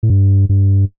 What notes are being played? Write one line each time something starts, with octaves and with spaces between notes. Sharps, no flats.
A2
G2
G2